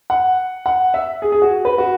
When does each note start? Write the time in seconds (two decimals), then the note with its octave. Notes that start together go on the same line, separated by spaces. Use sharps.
0.10 F#5
0.66 F#5
0.94 E5
1.22 G#4
1.32 G#4
1.42 F#4
1.65 B4
1.78 F#4